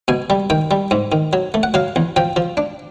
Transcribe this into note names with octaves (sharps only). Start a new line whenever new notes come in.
B2 G#5
G3
D#3 G5
G3
G#2
D#3
F#3
A3
F#5
F#3 F5
E2
F3 G5
F3
D4